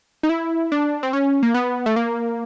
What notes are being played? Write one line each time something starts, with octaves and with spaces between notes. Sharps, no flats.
D#4
E4
D4
C4
C#4
A#3
B3
A3
A#3